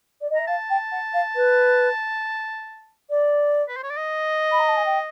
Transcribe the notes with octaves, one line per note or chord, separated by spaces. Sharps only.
D5
D#5
E5 A#5
F5 A5
G5
F#5
F5
B4
D5
B4
C5
C#5
D5
D#5
B5
A#5
A5
G#5
G5